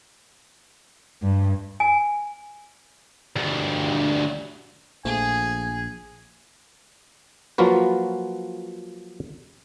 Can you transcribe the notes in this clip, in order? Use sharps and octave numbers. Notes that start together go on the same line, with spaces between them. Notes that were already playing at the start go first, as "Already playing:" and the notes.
G2
G#5
D2 G2
A#1 F3 A3 G#4 G#5
F3 F#3 A#3 F4 F#4 B4